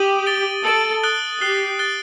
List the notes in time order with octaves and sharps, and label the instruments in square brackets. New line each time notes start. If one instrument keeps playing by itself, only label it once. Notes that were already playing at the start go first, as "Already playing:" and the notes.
Already playing: [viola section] G4 [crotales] D#6 D#7 F#7
[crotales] A6 D7 G7
[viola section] A4 [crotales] A6 D7 F#7
[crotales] D#6 F#6 A6 D7 G7
[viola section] G4 [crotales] F#6 C7 G7
[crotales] F#6 A6 D7 G7